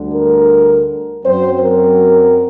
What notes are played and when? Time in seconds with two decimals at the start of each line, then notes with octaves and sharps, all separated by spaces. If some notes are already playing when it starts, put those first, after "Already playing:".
Already playing: D2 D3 G3
0.12 A#4
1.24 F#2 F#3 C4 C5
1.61 A#4